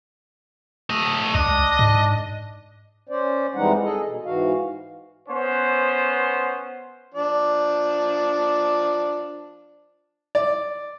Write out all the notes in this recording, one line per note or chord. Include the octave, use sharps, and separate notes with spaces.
A3 D#5
C#2 D4 D#5
G#2
C#4 C5 D5
F2 E3 G3 G#3 D#4 F#5
G#4 A4 D#5
B2
G#2 E3 F#4 F5
B3 C#4 C5
F3 D4 D5
D5